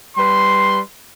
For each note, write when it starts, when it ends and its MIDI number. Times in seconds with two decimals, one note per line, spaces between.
0.16 0.79 55
0.16 0.79 71
0.16 0.79 84